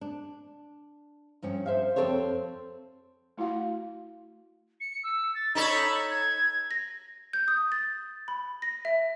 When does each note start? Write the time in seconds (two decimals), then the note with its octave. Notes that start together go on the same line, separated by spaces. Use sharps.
0.01 D4
1.42 G2 F3 C#4
1.66 C5 E5 F5
1.96 F2 C4 A4 C5 C#5
3.37 A3 E4 F#4 F5 F#5
4.80 C#7
5.04 E6
5.35 A6
5.55 D#4 A4 C#5 B5
6.10 G#6
6.71 A#6
7.33 G6
7.48 D#6
7.72 A6
8.28 B5
8.62 A#6
8.85 E5